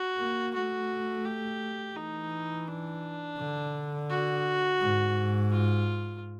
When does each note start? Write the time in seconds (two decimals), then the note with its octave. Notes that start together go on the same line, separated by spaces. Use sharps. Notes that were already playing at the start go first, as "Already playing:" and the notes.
Already playing: F#4
0.18 A#3
0.54 A3 F#4
1.25 G4
1.95 E3 D#4
2.68 D4
3.39 D3
4.10 F#4
4.80 G#2
5.52 F4